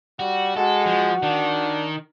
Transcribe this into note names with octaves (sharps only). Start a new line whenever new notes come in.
G3 F#4
G#3 F#4 A4
F3
D#3 D4